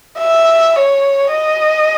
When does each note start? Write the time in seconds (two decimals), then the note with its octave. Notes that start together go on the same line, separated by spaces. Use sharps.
0.18 E5
0.76 C#5
1.31 D#5